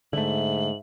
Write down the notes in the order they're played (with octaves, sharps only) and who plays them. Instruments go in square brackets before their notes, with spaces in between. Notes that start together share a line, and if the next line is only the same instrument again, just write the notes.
[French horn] G#2 [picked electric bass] D3 A3 [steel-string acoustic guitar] E5 [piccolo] F#7